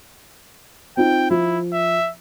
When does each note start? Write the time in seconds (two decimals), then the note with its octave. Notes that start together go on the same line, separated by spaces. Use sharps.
0.97 C4 D#4 F4 G5
1.30 F3 E4
1.73 E5